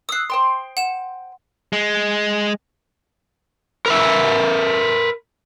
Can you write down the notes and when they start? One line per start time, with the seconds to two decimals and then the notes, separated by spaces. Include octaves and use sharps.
0.09 D#6 E6 F#6 C7
0.30 C5 G5 C6
0.77 F#5 E7
1.73 G#3
3.86 A#4 B4 E5